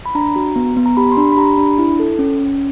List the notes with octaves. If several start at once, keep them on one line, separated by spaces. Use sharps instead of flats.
B5
D4 A#5
F#4
B3
B3
A#5
G4 B5
C6
D4 B5
B5
G4 A#5
D4 B5
E4
A4
C#4
C#4